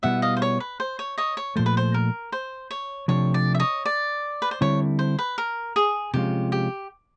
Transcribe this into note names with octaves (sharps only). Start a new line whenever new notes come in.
B2 G3 B3 E4 E5 F#5
D#5 F5
C5
C#5
B4
C5
C#5
C#5 D#5
C#5
A#2 F3 A3 C5
B4
C5
A#4
C5
C#5
C3 F3 A3 D4 C#5
D5
E5
C#5 D#5
D5
B4
C5
D3 G3 C4 E4 C#5
C5
B4
A#4
G#4
C3 F3 G#3 C#4 F4 G4
G4